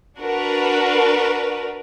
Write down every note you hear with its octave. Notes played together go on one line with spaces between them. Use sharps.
D4 F#4 A#4 B4